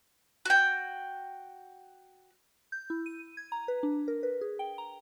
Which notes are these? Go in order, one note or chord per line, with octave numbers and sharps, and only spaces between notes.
F#4 G5
G6
E4
D#7
G#6
A#5
B4
D4
A#4
B4
G#4
G5
A#5